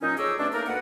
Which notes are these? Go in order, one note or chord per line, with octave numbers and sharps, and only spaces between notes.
A#2 F#3 C#4 D#4
F2 G#4 C#5 D#5 D6 E6
B2 A3 C#4 D4
A3 A#3 D#4 A#4
D2 A#3 B4 F#5